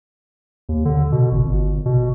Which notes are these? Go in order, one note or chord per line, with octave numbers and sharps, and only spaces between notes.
D#2
D3
B2
G#1
G1
B2